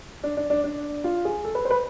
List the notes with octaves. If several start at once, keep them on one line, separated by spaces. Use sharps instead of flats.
D4
D4
D4
D4
F4
G#4
A4
B4
C5
B4